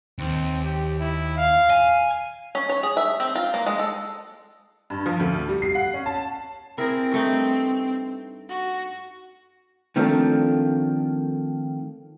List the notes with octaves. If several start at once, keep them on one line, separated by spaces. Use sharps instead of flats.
D#2 C4
G4
E4
F5
G#5
C#4
C#5
G#4
E5
C4
F4
A#3
G#3
A4
G2
F3
D2
G3
C7
F#5
C#4
A5
C4 E4 G#4 A#4
G2 A3 D#4
F#4
D#3 F3 A3 A#3 C4 D4